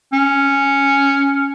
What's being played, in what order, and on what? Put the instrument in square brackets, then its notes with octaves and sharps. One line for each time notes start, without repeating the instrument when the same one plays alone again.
[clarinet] C#4